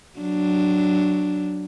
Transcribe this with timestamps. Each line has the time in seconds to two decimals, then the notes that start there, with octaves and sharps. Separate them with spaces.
0.19 F#3 D4